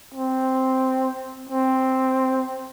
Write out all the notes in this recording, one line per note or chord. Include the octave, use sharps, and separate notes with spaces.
C4
C4